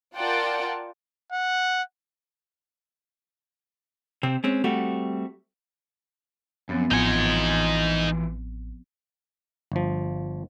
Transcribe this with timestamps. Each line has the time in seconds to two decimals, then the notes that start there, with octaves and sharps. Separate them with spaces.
0.16 F4 A#4 D5 F#5 G5 A5
1.32 F#5
4.23 C3 C4
4.44 G#3 C4 C#4
4.64 G3 A3 C4 F#4
6.69 F#2 F3 B3 C4
6.91 A1 E3 D#4 F4 F#5 G#5
9.72 G1 F3